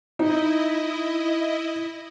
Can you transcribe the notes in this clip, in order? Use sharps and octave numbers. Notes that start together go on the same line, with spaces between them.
D#4 E4 D#5